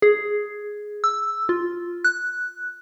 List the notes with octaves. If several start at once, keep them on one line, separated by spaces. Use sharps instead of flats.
G#4
E6
F4
F#6